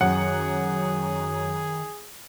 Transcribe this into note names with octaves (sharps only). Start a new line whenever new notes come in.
F#2 D#3 G#4 F#5